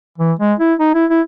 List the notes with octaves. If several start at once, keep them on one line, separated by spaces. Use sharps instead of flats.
E3
G#3
E4
D#4
E4
E4